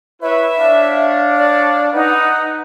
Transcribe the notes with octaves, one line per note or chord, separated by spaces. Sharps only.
E4 B4 C#5 E5
D4 C#5 F5
D5
D#4 B4 F#5